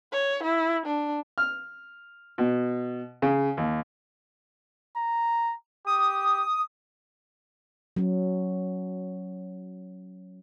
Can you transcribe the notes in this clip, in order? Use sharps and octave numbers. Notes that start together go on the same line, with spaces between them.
C#5
E4
D4
F6
B2
C#3
D#2
A#5
G4 D#6
F#3 C#4